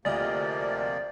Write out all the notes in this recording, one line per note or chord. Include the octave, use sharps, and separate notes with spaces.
D2 C3 F3 A#3 D5 D#5 F6